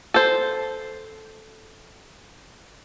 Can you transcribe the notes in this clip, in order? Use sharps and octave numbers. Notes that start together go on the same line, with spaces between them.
A4 C5